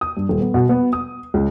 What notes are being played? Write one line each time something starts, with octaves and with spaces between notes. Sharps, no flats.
D#6
G2
D#1
B3
B2
B3
D#6
C#2